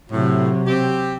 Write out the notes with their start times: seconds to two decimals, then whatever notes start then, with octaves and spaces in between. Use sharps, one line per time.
0.11 A2 C3 F#3
0.67 C4 G4